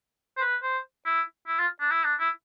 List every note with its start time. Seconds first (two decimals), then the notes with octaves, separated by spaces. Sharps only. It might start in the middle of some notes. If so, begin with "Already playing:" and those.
0.37 C5
0.41 B4
0.63 C5
1.06 E4
1.48 E4
1.58 F4
1.80 D4
1.91 E4
2.04 D4
2.19 E4